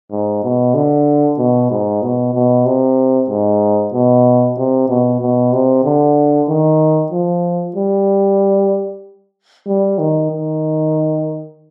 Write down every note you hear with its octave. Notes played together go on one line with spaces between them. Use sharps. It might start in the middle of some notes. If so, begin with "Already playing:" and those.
G#2
B2
D3
B2
G#2
B2
B2
C3
G#2
B2
C3
B2
B2
C3
D3
D#3
F3
G3
G3
D#3
D#3